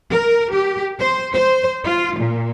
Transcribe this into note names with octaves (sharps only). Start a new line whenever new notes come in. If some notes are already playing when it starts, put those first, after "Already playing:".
A#4
G4
C5
C5
F4
A#2